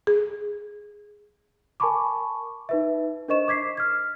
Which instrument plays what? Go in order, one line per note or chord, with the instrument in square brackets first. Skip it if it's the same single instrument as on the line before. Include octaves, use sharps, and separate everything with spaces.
[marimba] G#4
[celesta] A#4 G#5 A5 B5 C#6 D6
D#4 B4 E5
D4 A#4 C5 D#5 C#6 E7
D6 G#6 B6 C7
F6 G#6